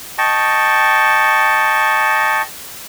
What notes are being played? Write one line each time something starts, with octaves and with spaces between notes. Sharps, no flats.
D#5 G5 A5 C#6